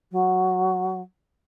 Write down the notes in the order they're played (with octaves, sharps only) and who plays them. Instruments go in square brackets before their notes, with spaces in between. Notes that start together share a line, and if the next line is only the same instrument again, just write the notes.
[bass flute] F#3